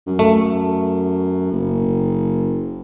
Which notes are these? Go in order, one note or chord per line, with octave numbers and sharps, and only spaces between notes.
F#2
A3
F#1